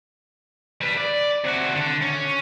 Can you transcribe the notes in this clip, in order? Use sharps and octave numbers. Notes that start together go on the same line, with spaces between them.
G3 B4
D5
C3 F#4
D3
C#4